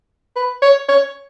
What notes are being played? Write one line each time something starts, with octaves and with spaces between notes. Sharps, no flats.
B4
C#5
C#5